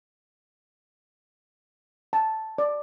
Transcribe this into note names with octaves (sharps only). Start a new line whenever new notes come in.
A5
D5